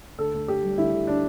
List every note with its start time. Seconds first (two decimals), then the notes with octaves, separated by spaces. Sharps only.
0.19 D2 A4
0.34 D2
0.48 D2 G4
0.64 G3
0.78 D2 E4
0.93 D3
1.07 D4